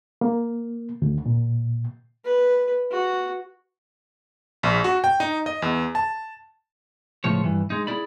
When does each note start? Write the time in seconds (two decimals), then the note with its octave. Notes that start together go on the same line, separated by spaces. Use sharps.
0.21 A#3
1.02 D2
1.26 A#2
2.24 B4
2.91 F#4
4.63 A#1
4.84 F#4
5.04 G5
5.20 D#4
5.46 D#5
5.62 E2
5.95 A5
7.24 C#2 A2 F3 C#5
7.44 G2 E3
7.70 G#3 D#4
7.87 E4 G#4 D5 B5